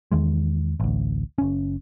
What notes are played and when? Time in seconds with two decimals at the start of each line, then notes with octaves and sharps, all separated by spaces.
0.12 E2 D#3 G#3
0.80 A1 D2
1.38 F#1 C#4